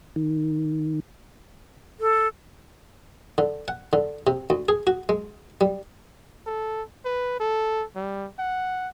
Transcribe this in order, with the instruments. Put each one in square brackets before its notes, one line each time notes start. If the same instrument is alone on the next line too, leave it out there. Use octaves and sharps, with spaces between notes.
[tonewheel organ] D#3
[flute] A4
[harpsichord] D3
F#5
D3
C3
D2
G#4
F#4
G#3
G3
[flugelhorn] A4
B4
A4
G3
F#5